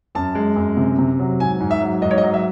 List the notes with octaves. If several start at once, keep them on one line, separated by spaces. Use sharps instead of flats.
F#2 A5
G#3
F#2
C3
C3
F#3
G#2 G#5
G#2
E5
F#3
G#2 D#5
C#5
D#5
F#3
E5